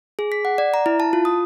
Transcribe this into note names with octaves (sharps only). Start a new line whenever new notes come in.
G#4
B6
F#5
D5
A#5
E4
A5
F4
D#6